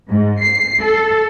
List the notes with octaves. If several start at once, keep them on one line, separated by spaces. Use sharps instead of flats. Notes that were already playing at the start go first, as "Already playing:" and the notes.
G#2
C7
A4